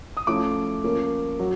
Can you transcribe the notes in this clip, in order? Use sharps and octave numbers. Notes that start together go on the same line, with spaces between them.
D#6
F3 A3 C#4 E4 D6
F3 A#3 C#4
F#3